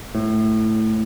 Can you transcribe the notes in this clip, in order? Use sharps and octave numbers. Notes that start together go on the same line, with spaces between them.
A2